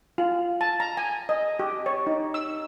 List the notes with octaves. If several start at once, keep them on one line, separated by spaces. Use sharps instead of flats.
F4
A5
A#5
G#5
D#5
G4
C#5
D#4
E6